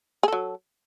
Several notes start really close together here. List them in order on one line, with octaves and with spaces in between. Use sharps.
G#4 A4 F#3